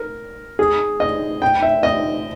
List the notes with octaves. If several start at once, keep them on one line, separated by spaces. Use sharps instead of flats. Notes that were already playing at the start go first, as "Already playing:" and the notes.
Already playing: A#4
G#4
D#5
G5
E5
D#5